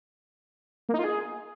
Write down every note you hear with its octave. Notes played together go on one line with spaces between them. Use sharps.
A#3
D#4
F4
G#4